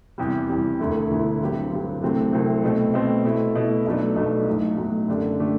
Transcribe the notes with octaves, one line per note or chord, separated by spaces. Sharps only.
E2 C3 G3
E2 C3 G3
E1 D2 D3 A3 E4
E1 D2 D3 A3 E4
G2 D3 F#3 C4 G4
G2 D3 F#3 C4 G4
C2 C3 F#3 A3 C4
C2 C3 F#3 A3 C4
B2 A3 C4
B2 A3 C4
B2 A3 E4
B2 A3 E4
B1 B2 F#3 A3 D4
B1 B2 F#3 A3 D4
B1 A2 F#3
B1 A2 F#3
F#2 D3 A3 D4 G4
D3 A3 D4 G4